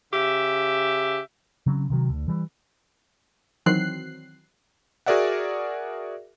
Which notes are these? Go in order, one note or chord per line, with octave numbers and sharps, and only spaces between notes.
C#3 G4 E5
C#3 F#3 C4 C#4
C3 D#3 F#3
D2
E3 G3
D#3 E3 F#3 C4 F#6 C7
F#4 G#4 A#4 D5 E5 F#5